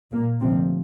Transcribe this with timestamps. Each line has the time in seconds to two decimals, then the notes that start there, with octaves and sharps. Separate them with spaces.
0.11 A#2 A#3
0.40 D2 C3 F3 C4